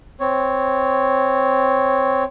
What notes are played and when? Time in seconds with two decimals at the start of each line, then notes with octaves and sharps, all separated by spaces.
0.20 C4 C#5